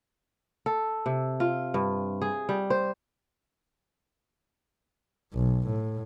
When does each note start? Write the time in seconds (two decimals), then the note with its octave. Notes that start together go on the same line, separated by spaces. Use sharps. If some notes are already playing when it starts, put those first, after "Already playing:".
0.66 A4
1.06 C3
1.40 F4
1.74 G2
2.22 G#4
2.49 G3
2.70 C5
5.34 B1
5.69 A2